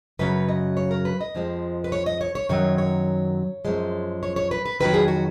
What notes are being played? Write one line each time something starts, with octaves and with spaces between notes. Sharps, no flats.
F#2 C#3 F#3 B4
D#5
C#5
A#4
B4
D#5
F2 F3 G#3
B4
C#5
D#5
C#5
C#5
F#2 D#3 F#3 C#5
C#5
F#2 F3 G#3
C#5
C#5
B4
B4
F2 D#3 F#3 B4
G#4
F#4